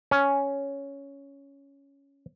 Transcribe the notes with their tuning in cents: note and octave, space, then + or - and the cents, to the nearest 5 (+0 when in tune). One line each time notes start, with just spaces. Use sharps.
C#4 +5